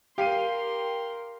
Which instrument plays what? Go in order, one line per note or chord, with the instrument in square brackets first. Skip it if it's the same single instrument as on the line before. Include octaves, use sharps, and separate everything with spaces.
[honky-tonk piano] G4 [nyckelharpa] A#4 C6 [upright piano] F5 C7 D#7